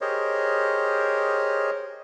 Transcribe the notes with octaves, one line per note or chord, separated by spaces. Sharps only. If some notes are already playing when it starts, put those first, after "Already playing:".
G4 G#4 A#4 C5 C#5 D#5